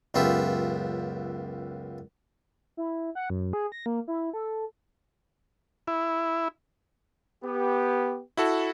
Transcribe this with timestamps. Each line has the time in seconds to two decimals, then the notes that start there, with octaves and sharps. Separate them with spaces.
0.14 C#2 F#2 B3 F4 G4 E5
2.77 E4
3.15 F#5
3.30 F#2
3.53 G#4
3.72 A#6
3.86 A#3
4.08 E4
4.33 A4
5.87 E4
7.44 B3 G4
8.37 E4 F#4 A4